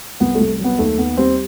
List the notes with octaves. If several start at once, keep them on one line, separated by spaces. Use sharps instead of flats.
C2 B3
C2 A3
F#3 B3
D#2 A3
D#2 B3
G3 C4